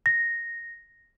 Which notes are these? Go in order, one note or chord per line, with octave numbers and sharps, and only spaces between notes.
A#6